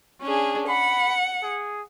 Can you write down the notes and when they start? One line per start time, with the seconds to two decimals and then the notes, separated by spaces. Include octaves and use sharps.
0.23 C#4 D4 G#4
0.69 F#5 B5
1.43 G#4